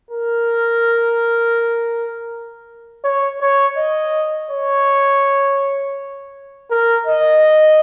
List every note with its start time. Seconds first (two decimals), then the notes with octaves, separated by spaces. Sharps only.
0.11 A#4
3.04 C#5
3.41 C#5
3.77 D#5
4.51 C#5
6.71 A#4
7.06 D#5